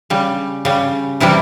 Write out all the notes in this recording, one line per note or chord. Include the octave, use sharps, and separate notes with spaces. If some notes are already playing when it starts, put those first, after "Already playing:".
C#3 G3
C#3 G3
C3 E3 G3 E4